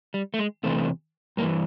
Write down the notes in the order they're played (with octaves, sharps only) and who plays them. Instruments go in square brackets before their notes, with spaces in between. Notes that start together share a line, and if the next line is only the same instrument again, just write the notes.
[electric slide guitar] G3
A3
G#3
E2 C3 E3 A3
G2 A#3
E3